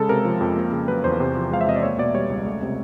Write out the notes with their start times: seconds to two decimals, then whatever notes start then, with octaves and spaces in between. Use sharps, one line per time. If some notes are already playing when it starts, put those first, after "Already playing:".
Already playing: C#3 G#3 A4
0.09 C3 A#4
0.25 F3
0.41 F2
0.57 A#3
0.73 C#3
0.88 F#3 B4
1.04 E2 C5
1.20 C3
1.35 F3
1.51 G#3 F5
1.61 E5
1.67 C3 D#5
1.76 D5
1.83 A#3 C#5
1.98 B2 D5
2.14 G3 C#5
2.30 C#2
2.46 A3
2.62 C3